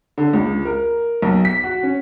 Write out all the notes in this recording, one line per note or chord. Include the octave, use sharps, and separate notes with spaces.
D3
C#2
A#4
B1
B6
F#4
C#4